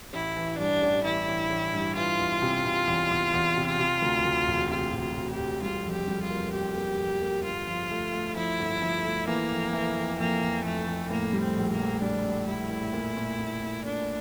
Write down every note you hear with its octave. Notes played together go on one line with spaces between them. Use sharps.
A1 E4
E3
G2 D4
A1
E3 E4
A1
A1
G2
E3 F4
E2
C3
C3
E2
E2
E2
C3
C3
D2
D2
E1
C3 F4
E1
F4
E1
G4
E1
G3 F4
F2
G4
G3
F4
A#3
F2 G4
A#3
F2
A#3
G1 F4
F3
A3
A3
F3 E4
G1
F3
A3
E3 A#3
F2
E3
F2
F2 A#3
F2
F2 A3
F2
A2 A#3
G3
C4
A#1
A#3
A#1
G3 D4
G3
G3 E4
A2
A#2
A#2
A#2
A#2
A#2 D4